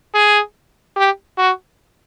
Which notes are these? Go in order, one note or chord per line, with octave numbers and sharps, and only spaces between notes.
G#4
G4
F#4